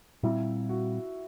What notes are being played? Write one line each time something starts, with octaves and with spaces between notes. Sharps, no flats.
A#2 G3 C4 E4
F#4